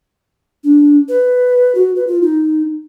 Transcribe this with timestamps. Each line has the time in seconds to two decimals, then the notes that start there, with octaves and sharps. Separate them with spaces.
0.64 D4
1.09 B4
1.75 F#4
1.96 B4
2.07 F4
2.22 D#4